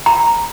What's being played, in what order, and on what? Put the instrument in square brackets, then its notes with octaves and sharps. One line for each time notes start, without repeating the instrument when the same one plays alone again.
[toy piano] A#5